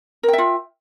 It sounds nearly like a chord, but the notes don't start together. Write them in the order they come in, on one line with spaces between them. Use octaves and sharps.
A#4 G5 E5 F4